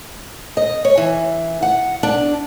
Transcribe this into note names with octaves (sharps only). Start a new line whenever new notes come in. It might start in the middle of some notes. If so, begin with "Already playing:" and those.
D#5
C#5
E3
F#5
D4